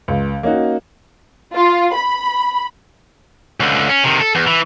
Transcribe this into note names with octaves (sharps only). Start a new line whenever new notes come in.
C#2
A#3 C#4 D#4 F#4
F4
B5
C#2 D3
C#4
C3 D#3
A4
E2
E3